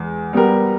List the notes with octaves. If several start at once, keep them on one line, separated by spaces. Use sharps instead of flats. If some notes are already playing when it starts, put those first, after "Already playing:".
Already playing: E2 G#3
G3 B3 G4 A#4